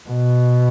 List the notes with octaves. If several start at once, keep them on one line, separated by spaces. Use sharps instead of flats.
B2